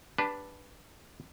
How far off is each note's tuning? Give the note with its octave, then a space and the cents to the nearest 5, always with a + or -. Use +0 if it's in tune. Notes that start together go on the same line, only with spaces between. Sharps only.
D4 +0 G4 +30 B4 +0